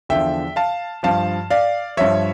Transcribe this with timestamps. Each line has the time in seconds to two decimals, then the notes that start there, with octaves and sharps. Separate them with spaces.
0.09 E2 D3 F3 E5 G5
0.56 F5 A5
1.03 G2 F3 F5 A5
1.50 D5 F5
1.97 G2 F3 C#5 E5